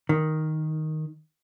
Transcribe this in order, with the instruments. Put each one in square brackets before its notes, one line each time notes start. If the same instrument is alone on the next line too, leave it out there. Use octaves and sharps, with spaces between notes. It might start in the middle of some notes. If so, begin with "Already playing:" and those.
[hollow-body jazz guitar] D#3